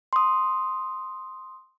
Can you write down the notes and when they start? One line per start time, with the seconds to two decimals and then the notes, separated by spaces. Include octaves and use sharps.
0.13 C6 D#6